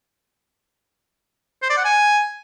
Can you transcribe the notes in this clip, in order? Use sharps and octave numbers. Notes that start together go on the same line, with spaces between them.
C5
D5
F#5
G#5